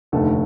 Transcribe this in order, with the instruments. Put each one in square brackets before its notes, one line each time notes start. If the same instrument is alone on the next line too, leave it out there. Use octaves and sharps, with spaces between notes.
[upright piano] F1 D#2 D3 A3 A4